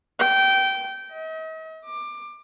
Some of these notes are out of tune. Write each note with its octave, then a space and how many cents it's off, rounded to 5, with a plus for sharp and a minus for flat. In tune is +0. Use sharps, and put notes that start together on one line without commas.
G5 -20
D#5 +45
D6 +20